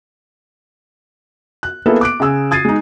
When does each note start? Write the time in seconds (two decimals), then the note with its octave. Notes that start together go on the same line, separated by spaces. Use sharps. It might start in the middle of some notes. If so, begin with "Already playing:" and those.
1.63 F#6
1.86 A#3 B3 E4 G#4 A4 B4
2.01 D6 F#6 D7
2.20 C#3 G#4 G#5 E6
2.51 D#6 G#6 A6 C7 D#7
2.65 G#3 D#4